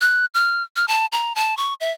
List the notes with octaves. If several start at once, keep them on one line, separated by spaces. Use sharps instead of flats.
F#6
F6
F6
A5
A#5
A5
C#6
E5